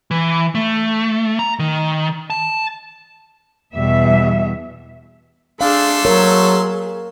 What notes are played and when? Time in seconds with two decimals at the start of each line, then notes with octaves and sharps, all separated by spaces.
0.11 E3
0.55 A3
1.39 A#5
1.59 D#3
2.30 A5
3.75 E2 B2 G3 E5
5.61 A3 D4 G#4 F5 C6 E6
6.05 F#3 G#4 A#4 C#5